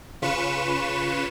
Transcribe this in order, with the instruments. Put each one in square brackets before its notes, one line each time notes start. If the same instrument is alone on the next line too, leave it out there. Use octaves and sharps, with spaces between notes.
[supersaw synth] C#3 F4 B4 C#6 E7